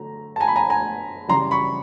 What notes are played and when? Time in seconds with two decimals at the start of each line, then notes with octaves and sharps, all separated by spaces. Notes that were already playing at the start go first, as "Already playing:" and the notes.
Already playing: D3 F#3 A3 A#5
0.36 A5
0.40 G#5 A#5
0.48 B5
0.56 G#5 A#5
0.70 G#5 A#5
1.28 C#3 E3 G3 A#5 C6
1.51 B5 C#6